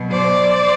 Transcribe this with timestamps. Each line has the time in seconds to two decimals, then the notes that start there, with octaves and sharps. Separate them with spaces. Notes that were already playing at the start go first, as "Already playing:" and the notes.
Already playing: B2 F#3
0.11 C5 D5